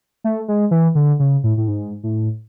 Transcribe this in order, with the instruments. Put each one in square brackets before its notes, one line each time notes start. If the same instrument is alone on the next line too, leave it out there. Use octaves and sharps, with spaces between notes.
[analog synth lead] A3
G#3
E3
D3
C#3
A2
A2
G#2
A2